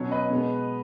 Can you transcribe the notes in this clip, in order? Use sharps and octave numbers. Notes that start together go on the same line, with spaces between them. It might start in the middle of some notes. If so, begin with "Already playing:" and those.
Already playing: B2 F#3 C#4 C#5
B4 D#5
B2 G#3 B3